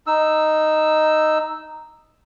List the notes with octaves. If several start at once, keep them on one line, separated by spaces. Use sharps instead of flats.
D#4 E6